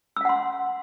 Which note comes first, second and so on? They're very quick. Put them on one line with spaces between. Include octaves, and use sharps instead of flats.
E6 F5 F#5 C6